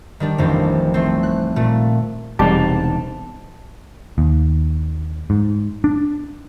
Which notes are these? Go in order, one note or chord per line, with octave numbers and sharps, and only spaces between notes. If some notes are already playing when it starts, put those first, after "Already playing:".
D#3 G3 D4
A1 F2 D#3 G3
A3 C4
F#6
A#2 A3
E1 C2 G3 G#3 C4 D#4 G4 A5
D#2
G#2
D4